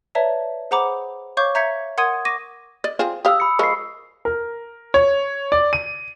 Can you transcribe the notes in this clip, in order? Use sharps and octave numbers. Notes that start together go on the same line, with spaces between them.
B4 C#5 D5 E5 A5 A#5
G#4 C5 F#5 A#5 B5 D6
C#5 F5 C#6 D6 G6
E5 A#5 G6 G#6 B6 C#7
A#4 F#5 C6 D#6 G#6 D#7
C#6 D6 A#6 D#7
D5 D#5
C4 F4 G#4
G4 F5 D#6 E6
B5 C#7
F3 G#3 A#4 C#6 C7
A#4
C#5
D5
D#7